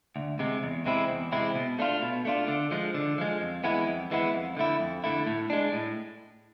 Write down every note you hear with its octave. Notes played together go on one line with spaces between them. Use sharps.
D2
C3 G#3
E2
C3 G#3 C4 E4
E2
C3 G#3 C4 E4
B2
A3 D4 F4
B2
A3 D4 F4
D3
F3 G#3
D3
F3 G#3
F2
E3 G#3 B3 E4
F2
E3 G#3 B3 E4
F2
D3 A3 E4
F2
D3 A3 E4
A2
G#3 D4
A2